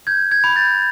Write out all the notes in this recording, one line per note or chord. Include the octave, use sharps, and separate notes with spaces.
G6 G#6
G#6
B5
G6 A6